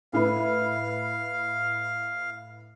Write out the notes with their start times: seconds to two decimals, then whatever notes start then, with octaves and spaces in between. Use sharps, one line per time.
0.13 A2 E4 B4 F5